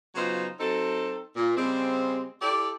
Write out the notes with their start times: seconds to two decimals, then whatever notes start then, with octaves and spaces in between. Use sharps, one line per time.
0.15 C#3 F#3 B3 D#4 F4 C5
0.60 F#3 C4 D#4 A4
1.36 A#2
1.57 C#3 G3 G#3 C4
2.42 E4 G4 A4 D5